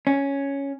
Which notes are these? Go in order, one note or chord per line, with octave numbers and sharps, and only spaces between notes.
C#4